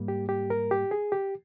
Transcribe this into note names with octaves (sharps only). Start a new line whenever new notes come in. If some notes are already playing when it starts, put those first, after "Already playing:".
Already playing: G#2 G3 A#3
G4
G4
A#4
G4
G#4
G4